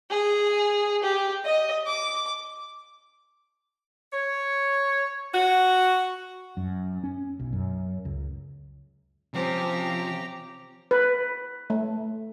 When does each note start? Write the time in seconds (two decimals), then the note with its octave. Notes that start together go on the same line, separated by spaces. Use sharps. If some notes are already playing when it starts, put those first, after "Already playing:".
0.10 G#4
1.03 G4
1.45 D#5
1.87 D6
4.13 C#5
5.34 F#4
6.57 F#2
7.04 C#4
7.39 B1
7.53 F#2
8.05 C#2
9.34 C3 F3 C4 C#4 G4 A#5
10.91 B4
11.70 A3